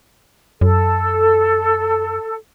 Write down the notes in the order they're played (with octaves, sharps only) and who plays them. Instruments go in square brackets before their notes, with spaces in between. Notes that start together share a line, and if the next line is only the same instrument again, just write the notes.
[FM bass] F#2 [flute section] A4